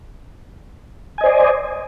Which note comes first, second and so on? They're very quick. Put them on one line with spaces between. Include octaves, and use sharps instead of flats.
G#5 D#5 C5 D5